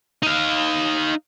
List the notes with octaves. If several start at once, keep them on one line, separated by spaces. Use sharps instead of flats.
D#4 F5